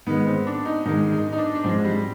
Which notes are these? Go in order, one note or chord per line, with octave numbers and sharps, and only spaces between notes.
G#2 D#3 G#3 B3
C4
D4
D#4
G#2 D#3 G#3 D#4
D#4
D#4
D4
D4
G#2 F3 G#3 C4
G3